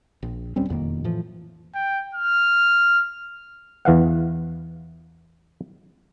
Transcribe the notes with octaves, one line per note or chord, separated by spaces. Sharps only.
A#1
D#1 G3 C4 C#4
E1 F2 D#3 A#3
A2 E3 F3
G5
F6
E2 E3 F5 F#5